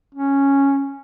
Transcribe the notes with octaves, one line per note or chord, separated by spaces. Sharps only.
C#4